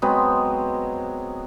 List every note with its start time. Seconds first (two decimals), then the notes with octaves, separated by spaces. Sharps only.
0.02 F#3 G#3 B3 C4